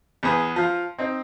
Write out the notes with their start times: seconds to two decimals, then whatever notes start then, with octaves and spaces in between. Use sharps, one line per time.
0.23 E2 B3 G#4 B4
0.56 F3 F4
0.98 C4 D#4